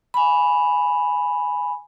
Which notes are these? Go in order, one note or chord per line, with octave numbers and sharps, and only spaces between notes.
G#5 B5